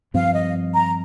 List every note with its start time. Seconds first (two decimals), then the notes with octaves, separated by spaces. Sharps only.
0.14 G2 F3 C4 F5
0.34 D#5
0.74 A#5